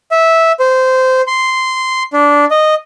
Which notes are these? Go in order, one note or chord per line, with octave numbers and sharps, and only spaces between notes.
E5
C5
C6
D4
D#5